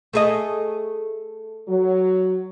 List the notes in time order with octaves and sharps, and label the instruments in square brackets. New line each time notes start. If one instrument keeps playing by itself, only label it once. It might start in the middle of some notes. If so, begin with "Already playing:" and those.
[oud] A3 G#4 D#5
[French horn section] F#3